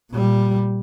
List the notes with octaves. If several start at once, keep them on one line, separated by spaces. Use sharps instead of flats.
A#2 G3